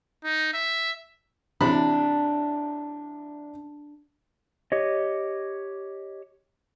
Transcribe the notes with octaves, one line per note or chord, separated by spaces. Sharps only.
D#4
E5
A1 C3 D4 B5
G4 C#5 D#5